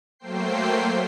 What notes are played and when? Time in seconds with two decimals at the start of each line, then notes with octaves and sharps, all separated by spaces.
0.19 F#3 A3 A#3 C5 G5 C7